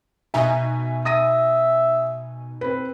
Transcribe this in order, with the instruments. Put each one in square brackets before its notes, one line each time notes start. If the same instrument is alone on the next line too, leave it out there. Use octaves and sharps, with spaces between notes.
[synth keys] B2 D#4 G#5 [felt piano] E5 A#5
[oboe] E5 [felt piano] D#6 A#6 D#7
[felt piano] C4 B4